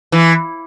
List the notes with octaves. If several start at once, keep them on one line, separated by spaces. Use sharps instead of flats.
E3